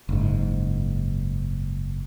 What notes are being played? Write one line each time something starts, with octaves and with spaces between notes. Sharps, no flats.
F#1 G#2